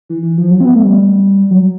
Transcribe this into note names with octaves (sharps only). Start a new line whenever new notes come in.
E3
E3
F3
F#3
C4
B3
A3
G3
F#3